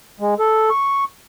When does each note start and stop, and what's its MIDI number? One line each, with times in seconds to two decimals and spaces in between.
0.20 0.34 56
0.40 0.70 69
0.70 1.04 85